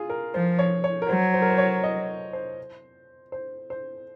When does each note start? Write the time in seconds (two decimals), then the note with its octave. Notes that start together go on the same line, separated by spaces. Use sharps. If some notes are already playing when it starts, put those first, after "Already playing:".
Already playing: F4 G#4
0.10 A#4
0.34 F3 C5
0.59 C#5
0.84 C#5
1.02 A#4
1.09 F#3 C5
1.34 C5
1.42 A#4
1.50 C5
1.58 C#5
1.84 D#5
2.33 C5
3.32 C5
3.70 C5